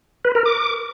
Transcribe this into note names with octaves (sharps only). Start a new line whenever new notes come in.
B4
A#4
D6